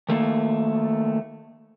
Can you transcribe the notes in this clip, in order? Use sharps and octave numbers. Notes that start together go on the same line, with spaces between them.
D#3 A3 A#3